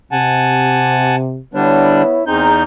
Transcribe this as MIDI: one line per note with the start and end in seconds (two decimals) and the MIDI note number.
0.12 1.38 48
0.12 1.16 78
0.12 1.16 80
0.12 1.16 81
1.54 2.02 50
1.54 2.02 55
1.54 2.22 59
1.54 2.02 62
1.54 2.22 64
1.54 2.22 73
2.27 2.63 40
2.27 2.51 60
2.27 2.63 63
2.27 2.51 68
2.27 2.51 82
2.27 2.63 91